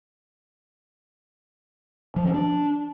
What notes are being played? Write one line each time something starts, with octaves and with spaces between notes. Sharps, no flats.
F3
C#4
D4